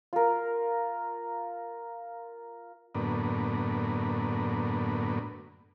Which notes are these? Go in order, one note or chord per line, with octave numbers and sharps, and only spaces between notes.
F4 A#4
F#2 A2 D3 A#3 B3